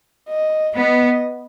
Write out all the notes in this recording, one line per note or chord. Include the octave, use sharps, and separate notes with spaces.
D#5
B3 D#5